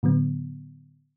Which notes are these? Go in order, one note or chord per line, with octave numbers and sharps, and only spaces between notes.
A2 D3 F#3 B3